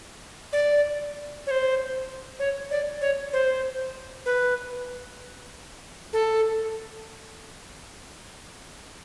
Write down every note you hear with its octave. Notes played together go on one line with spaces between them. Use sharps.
D5
C#5
C5
C#5
D5
C#5
C5
B4
A4